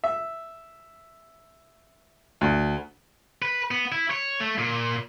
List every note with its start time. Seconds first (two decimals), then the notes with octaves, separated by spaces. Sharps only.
0.04 E5
2.41 D2
3.42 B4
3.71 B3
3.92 E4
4.11 C#5
4.40 A3
4.58 A#2